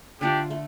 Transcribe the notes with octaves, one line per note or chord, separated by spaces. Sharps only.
D3 A3 D4 F4 G4
A3